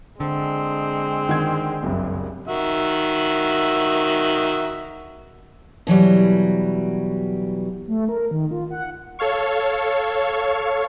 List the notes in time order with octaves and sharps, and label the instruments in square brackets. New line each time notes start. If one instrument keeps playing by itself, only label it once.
[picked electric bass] D3 [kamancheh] G#3 [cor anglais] C4
[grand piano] D#3 F#5 G#6
F#1 C2 G2
[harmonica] D#3 F#4 E5
[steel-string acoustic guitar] B2 E3 F#3 G3
[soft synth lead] A3
A#4
D#3
F4
F#5
[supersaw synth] A4 C#5 F5 C#6